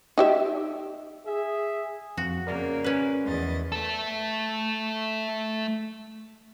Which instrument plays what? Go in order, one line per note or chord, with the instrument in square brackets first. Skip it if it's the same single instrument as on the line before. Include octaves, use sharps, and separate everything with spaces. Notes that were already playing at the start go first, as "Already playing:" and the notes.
[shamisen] D#4 G4 E5
[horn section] G#4 E5
[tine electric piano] F2 [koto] F#4
[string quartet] C#3 A#3 [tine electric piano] A#4 D5
[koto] C#4 B4
[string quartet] E2 D#5 A6
[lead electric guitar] A3 A4